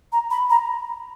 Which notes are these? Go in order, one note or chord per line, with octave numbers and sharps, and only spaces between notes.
A#5
B5
A#5